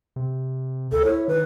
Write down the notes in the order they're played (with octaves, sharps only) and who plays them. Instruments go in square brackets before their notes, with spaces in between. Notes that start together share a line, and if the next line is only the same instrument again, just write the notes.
[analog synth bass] C3
[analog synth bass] D2 [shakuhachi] A4
[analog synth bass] E4 [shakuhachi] C#5
[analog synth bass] D#3 [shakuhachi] B4